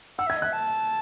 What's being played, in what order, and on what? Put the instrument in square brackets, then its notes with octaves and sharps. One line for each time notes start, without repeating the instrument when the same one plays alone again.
[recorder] F#5 [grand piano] E6
[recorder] E5
[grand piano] G#6
[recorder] D#5
[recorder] E5 [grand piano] F#6
[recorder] A5